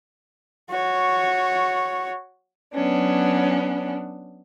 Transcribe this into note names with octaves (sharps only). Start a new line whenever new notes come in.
F#4 C#5
F#3 B3 C#4 D4